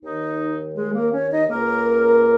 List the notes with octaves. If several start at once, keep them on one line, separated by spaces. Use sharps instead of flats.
D#2 D#3 D#4
G#3 G#4
A#3 A#4
C#4 C#5
D#4 D#5
C#2 C#3 A#3 A#4